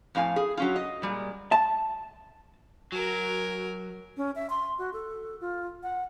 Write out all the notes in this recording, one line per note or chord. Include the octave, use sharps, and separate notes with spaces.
F2 A2 F5 G#5
G#4
F#3 C#4 F4
D#5
A#2 G3 G#3
A5
F#3 F#4 A#4 G#5
C#4
E5
C6
F#4
A4
F4
F#5